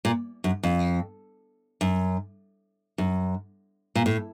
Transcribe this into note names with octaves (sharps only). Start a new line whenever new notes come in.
A#2
F#2
F2
F#2
F#2
A#2
A2